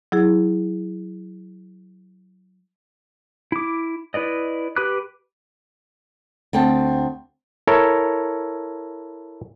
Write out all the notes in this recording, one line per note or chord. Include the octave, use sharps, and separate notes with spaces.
F#3 E4 G#4
E4 D6
E4 B4 D5 D#5
G4 B4 B5 D6 F#6
D2 C4 G5 A5
E4 A4 A#4 C#5